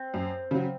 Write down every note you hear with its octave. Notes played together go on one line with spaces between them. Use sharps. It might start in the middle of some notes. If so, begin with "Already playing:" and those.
Already playing: C4
F#2
C#3 F#3